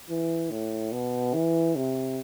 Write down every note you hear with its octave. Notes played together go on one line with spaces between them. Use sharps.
E3
A2
B2
E3
C3